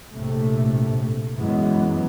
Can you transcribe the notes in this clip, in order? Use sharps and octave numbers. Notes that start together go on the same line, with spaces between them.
A#1 A2 C3 A3
F#2 E3 F#3 G#3 B3